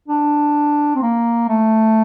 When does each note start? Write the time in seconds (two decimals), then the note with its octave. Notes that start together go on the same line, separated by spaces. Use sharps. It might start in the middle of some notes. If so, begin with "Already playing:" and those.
0.08 D4
0.96 C4
1.02 A#3
1.49 A3